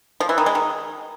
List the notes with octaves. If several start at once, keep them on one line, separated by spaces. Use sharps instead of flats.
F3
E3
D#3
G#3
D#3